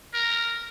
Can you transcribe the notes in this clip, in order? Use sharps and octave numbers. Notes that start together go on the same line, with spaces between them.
A#4